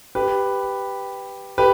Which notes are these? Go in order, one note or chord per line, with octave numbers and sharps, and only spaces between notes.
G4 B4
G4 B4